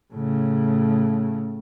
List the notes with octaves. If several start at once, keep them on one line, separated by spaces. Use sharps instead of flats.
A2 C#3